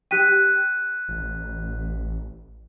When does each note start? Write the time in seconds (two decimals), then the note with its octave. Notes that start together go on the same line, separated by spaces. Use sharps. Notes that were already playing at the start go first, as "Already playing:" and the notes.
0.11 G4 G5 F#6 B6 D#7
1.09 A1